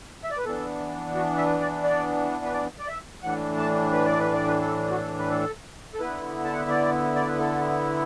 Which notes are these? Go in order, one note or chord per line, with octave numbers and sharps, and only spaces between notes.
E5
D5
B4
E3 B3 D4 A4
F#4
E5
D5
D5
B4
D5
D5
E5
A2 E3 D4 F#5
A5
B4
D5
B4
D5
B4
A4
F#4
A4
B4
A4
A4
D3 B3 E4 B4
A5
F#5
E5
D5
D5
B4
A4